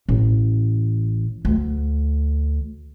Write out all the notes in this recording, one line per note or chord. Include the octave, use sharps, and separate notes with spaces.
A1
D2